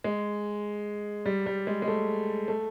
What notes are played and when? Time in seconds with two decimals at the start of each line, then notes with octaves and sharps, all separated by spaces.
0.04 G#3
1.26 G3
1.46 G3
1.67 G#3
1.82 G#3
1.88 A3
2.48 A3